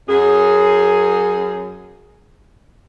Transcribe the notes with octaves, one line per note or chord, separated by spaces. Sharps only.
F#2 G#4